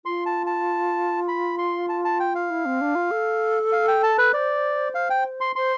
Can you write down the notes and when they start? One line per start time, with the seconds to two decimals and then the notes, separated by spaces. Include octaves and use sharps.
0.05 F4 C6
0.26 A5
0.46 A5
1.28 B5
1.58 C6
1.89 A5
2.05 A5
2.20 G5
2.35 F5
2.50 E4
2.65 C4
2.81 D4
2.95 F4
3.11 A4
3.72 F5
3.88 G5
4.03 A5
4.18 B4
4.34 C5 D5
4.95 F5
5.10 G5
5.41 C6
5.56 C5 C6